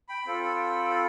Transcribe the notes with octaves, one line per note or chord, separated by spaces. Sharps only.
G5 B5
C4 F4 A4
G5 B5